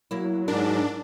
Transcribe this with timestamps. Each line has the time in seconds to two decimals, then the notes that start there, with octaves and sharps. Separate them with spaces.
0.11 F#3 A#3 E4
0.48 G#2 D4 A#4